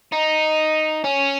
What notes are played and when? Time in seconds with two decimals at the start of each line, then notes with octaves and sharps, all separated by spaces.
0.12 D#4
1.04 C#4